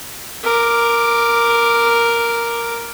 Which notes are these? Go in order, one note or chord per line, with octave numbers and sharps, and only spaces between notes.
A#4 D6